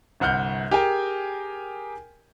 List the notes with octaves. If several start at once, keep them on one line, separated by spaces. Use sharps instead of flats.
G1 C2 F#5 F6 G6
G4 G#4 A#4 G5 G#5